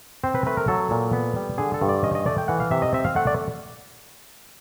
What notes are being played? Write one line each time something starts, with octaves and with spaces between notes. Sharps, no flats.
C4 C5
B4
A3 B4
A#4
F#3 A4
A#2
B3
G3
D3 G#4
A4
G2
D5
C#4 D#5
D#5
A3 D5
G5
E3 F#5
F5
C3 E5
D#5
C4 E5
F5
A3 F#5
D5